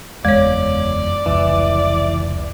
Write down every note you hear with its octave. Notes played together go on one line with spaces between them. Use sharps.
F#1 E2 G#3 C#5 D5
F1 C#2 E3